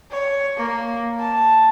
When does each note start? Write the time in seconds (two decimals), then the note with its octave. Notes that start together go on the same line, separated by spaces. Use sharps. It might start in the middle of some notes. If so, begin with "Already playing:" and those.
0.10 C#5
0.57 A#3
1.20 A5